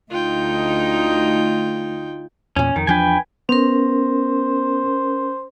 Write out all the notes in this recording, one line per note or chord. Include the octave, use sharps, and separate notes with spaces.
D2 D#4 F4 G5
E2 A#2 C#4
F2 D#3
E2 F3 D4 B4 G5 G#5
B3 C#4 A#4 C5